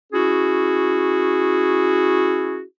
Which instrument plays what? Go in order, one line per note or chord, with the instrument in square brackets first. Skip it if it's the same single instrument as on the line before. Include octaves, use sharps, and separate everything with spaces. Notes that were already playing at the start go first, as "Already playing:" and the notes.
[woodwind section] C#4 E4 F#4 G#4